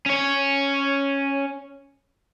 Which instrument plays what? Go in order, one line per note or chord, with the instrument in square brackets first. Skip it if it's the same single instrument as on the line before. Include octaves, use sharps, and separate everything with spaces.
[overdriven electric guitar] C#4 C#5